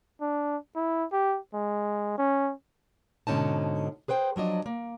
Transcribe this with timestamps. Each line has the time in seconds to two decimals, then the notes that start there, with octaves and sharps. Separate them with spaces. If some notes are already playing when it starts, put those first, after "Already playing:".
0.21 D4
0.75 E4
1.12 G4
1.54 G#3
2.18 C#4
3.27 G#2 B2 D3 C#4 D#4 A5
4.08 G#4 B4 C5 G5
4.36 F3 F#3 D4 D#5
4.66 A#3